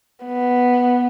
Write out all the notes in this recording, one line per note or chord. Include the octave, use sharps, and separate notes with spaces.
B3